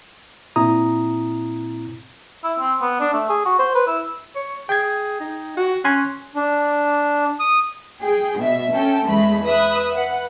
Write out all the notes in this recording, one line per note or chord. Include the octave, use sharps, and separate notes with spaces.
A#2 C4 E4 A#5 D#6
E4
C4
B3
D4
A3
G#4
F#4
C5
B4
E4
C#5
G#4 G5 G#6
D#4
F#4
C#4 G#5 C6 F#6
D4
D#6
G#4 G5
B2 E5
C#4 A4 G5
E2 G#3 A3 B5
B4 E5 B5 D#6 F#6
B4 F#5